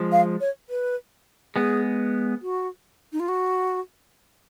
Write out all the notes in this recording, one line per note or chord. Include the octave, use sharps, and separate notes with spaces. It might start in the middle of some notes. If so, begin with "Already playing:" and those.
Already playing: F3 G#3
F5
C#5
B4
G#3 B3 G#4
F#4
D#4
F4
F#4